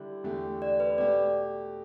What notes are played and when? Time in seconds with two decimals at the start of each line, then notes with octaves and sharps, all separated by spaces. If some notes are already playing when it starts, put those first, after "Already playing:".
Already playing: D3 G3 E4
0.24 E2 D3 A3 G4
0.62 D5
0.80 B4
0.98 B2 A3 G4 D5